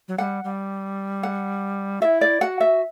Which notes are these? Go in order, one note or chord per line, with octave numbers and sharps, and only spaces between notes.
F#3
G3 F#5
G3
F#5
E4 F#4 E5
D5
F#4 F#5
E5